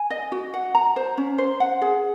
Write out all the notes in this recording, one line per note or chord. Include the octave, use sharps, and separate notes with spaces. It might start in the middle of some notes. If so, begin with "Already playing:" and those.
Already playing: G#5
D#5
F#4
F#5
A#5
C5
C#4
C5
F#5
G#4